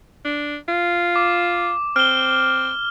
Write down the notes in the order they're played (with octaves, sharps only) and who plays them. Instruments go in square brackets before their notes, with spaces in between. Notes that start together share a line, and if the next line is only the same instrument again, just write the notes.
[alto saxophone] D4
F4
[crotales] D6
[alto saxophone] C4 [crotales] F6 G7